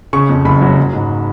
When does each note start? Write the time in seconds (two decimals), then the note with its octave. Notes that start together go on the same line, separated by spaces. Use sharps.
0.13 C#3 C#6
0.29 F2
0.45 F#1 B5
0.61 F#3
0.77 F#3
0.93 G#2